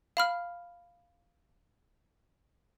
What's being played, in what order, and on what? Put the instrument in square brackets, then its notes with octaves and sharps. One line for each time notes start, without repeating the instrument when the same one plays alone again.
[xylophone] F5 B5 F6